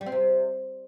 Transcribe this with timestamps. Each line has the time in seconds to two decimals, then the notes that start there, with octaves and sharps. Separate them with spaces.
0.01 G3
0.06 C4
0.12 C3